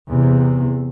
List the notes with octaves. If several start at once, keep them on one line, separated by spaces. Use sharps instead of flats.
E2 C3